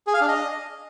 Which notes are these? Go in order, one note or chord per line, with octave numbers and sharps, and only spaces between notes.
G#4
F5
D4
D#5